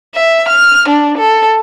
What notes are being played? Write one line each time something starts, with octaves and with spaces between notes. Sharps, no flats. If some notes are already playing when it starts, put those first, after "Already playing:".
E5
F6
D4
A4